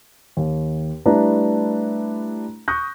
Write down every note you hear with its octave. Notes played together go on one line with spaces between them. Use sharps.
D#2
G3 A3 D4 E4 B4 A#5
C#6 D#6 F#6 G6 A#6